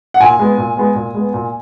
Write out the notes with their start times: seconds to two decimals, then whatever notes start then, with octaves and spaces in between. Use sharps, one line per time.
0.14 F#5
0.20 A#2 G#5
0.39 G#3 B3
0.57 A#2
0.77 G#3 B3
0.95 A#2
1.14 G#3 B3
1.34 A#2